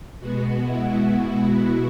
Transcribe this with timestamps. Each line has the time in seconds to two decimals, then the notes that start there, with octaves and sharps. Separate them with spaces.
0.20 B2 G#3 B3 F#4
0.66 E4
1.12 F#4
1.58 F#4